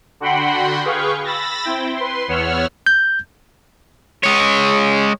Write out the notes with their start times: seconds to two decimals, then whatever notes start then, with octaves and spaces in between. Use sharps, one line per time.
0.20 D3 F#4 F#5 G5 B5 C6
0.85 G#4 B4 F5 G5 C#6
1.24 B5 E6 A6 A#6
1.64 C4 E4 G5
1.96 B4 C6
2.28 E2 B3 C#5 F#5 E6 F6
2.87 G6
4.24 G#3 C#5